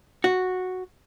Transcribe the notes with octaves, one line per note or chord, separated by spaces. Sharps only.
F#4